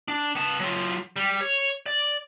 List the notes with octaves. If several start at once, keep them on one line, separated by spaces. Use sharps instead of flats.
D4
B3 A5
F#3 F4
G3
C#5
D5